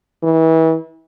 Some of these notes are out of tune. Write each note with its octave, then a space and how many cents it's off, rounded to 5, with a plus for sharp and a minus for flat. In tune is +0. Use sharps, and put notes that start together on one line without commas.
E3 -30